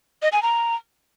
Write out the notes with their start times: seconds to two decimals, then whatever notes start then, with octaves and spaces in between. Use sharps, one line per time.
0.22 D#5
0.32 G#5
0.42 A#5